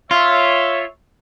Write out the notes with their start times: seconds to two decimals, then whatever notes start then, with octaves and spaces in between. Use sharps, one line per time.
0.11 F4 C#5 E5